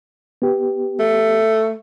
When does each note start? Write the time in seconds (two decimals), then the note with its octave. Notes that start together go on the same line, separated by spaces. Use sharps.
0.42 B3 G4
0.99 A3